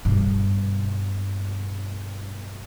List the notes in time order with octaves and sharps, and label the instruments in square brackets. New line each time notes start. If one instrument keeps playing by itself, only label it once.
[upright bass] G2 B2